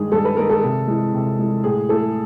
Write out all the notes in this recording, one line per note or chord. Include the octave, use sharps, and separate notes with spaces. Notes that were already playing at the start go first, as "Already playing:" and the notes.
Already playing: G2 D#3 G#3 G#4
G2 A4
B4
D#3 G#3 A#4
A4
C3
E3 G#3
C3
E3 G#3
A2 G#4
E3 A3 A4